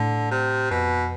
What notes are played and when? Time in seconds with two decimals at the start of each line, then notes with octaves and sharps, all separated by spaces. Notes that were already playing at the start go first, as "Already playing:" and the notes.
Already playing: A2 D3
0.31 C3
0.71 F2 B2